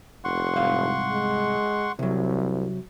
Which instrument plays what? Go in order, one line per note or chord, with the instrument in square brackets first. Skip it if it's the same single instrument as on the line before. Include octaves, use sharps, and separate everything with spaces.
[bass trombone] F1 [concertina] F#5 C6 C#6
[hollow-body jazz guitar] C2 G#2 F5
[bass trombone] G#3
[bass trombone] C2 [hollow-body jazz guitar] C3 F#3